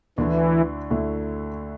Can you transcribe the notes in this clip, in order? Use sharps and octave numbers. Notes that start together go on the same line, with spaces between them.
D2 D3 E3 A3 E4
D2 D3 A3 E4